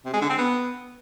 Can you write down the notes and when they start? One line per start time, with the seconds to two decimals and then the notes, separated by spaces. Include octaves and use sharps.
0.05 C3
0.14 G#3
0.22 D3
0.30 C4
0.38 B3